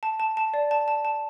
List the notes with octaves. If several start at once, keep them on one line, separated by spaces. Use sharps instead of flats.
A5
A5
A5
D5
A5
A5
A5